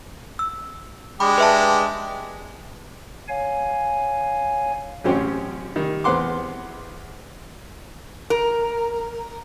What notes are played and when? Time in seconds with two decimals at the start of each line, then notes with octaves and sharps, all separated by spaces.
0.39 E6
1.20 G#3 D4 G4 B5 D6
1.38 B4 E5 A5
3.28 C#5 F5 G#5
5.04 A1 F#2 C3 C#4 C5 G5
5.76 D#3 G3
6.04 E2 C4 B4 F#5 C6 D6
8.30 A#4